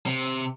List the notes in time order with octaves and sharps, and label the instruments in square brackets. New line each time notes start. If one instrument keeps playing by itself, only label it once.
[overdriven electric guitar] C3